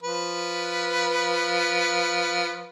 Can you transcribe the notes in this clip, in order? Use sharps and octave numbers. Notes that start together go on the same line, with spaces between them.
F3 B4